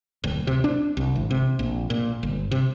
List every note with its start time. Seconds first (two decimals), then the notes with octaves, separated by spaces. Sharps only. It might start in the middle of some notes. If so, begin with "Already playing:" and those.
0.24 D1
0.47 C3
0.64 D4
0.97 C2
1.16 G#1
1.31 C3
1.59 A#1
1.90 A#2
2.23 G1
2.51 C3